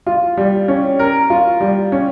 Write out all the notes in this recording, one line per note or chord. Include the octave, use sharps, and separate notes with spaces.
F4
G3
C#4
A#4
F4
G3
C#4